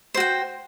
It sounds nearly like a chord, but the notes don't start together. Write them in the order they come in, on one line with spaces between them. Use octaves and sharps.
C5 F#4 G5